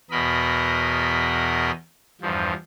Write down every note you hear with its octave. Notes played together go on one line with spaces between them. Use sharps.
E2 B2 A#4 D#5 B5
E2 G2 F3